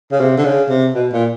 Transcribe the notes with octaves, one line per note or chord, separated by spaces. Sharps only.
C#3
C3
D3
C#3
C3
B2
A#2